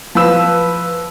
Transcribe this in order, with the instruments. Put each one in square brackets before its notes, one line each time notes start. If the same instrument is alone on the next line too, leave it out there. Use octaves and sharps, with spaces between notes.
[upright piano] F3 B4 E6